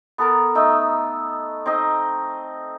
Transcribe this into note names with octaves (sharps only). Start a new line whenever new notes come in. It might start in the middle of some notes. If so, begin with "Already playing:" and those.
B3 A4 A#4
A3 D#4 E6
C4 D#4 D#5